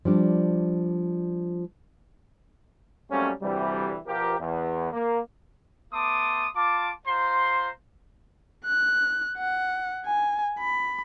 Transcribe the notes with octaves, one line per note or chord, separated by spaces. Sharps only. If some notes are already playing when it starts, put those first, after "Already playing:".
F3 G3 D4
F#3 G3 A3 A#3 C4 C#4
D2 C3 E3 G3
B2 F3 G4 A#4
E2
A#3
A3 B3 A5 C6 D6 D#6
F4 A5 D6
F4 C5 A#5 C6
F#6
F#5
G#5
B5